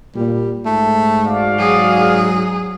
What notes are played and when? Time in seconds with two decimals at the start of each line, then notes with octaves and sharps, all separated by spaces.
0.16 A#2 G3
0.66 G#2 A3
1.26 F#4 D5 F5
1.59 F#3 G#4